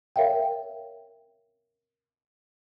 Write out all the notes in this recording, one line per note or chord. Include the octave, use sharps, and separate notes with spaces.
A#4 C#5 E5 F5 G5